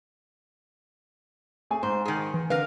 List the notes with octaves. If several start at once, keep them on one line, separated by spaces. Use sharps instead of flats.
A3 G#4 G#5
G#2 C5
D#3 G#4
E3
D3 A#4 B4 F5